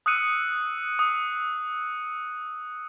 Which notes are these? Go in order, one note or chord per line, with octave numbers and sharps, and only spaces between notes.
D#6 E6 F#6 C#7 D#7
D#6